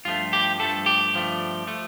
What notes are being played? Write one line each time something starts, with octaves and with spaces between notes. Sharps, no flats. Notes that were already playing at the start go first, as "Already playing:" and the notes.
G2 F3 A3 F4
G4
G2 F3 A3 A4
G4
G2 F3 A3
F3 A3